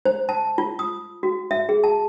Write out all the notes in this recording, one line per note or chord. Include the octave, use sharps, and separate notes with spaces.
C5
A5
F4
D#6
F#4
E5
G#4
A5